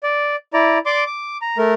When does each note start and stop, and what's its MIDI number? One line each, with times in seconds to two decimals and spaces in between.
0.03 0.36 74
0.53 0.78 64
0.53 0.78 74
0.53 0.78 82
0.86 1.04 74
0.86 1.04 84
0.86 1.04 86
1.06 1.37 86
1.42 1.58 82
1.58 1.74 57
1.58 1.74 70